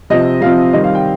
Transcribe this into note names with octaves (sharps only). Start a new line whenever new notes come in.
C3 F3 C4 D#5
C3 F3 C4 F5
D#3 G3 C4 D#5
F5
G5